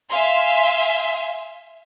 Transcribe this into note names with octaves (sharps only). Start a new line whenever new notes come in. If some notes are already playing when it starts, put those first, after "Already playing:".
E5 F5 G#5 C6